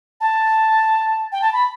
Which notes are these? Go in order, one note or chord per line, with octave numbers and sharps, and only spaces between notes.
A5
G5
A5
B5